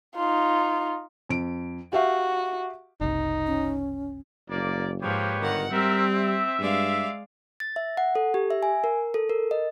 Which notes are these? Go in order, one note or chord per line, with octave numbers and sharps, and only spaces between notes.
D#4 F4
F2 D7
F#4 G4 E5 F5
F#1 C2 D#4
C#4
F#1 A#3 D5
G#2 F3 A#3 G4 B4 C#5
G1 D#3 F#5
G3 C4 A#4 E5
E5
G2 G#3 D5 F5
A6
E5
F#5
A4
G4
E5
G#5
A#4
A4
A#4
D#5